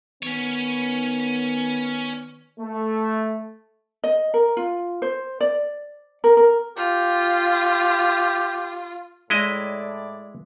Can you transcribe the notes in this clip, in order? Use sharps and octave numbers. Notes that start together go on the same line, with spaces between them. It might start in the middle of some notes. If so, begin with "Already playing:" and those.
D#3 B3 C#4 C#5
A3
D#5
A#4
F4
C5
D5
A#4
A#4
F4 G4
A2 G#3 E4 D5 D#5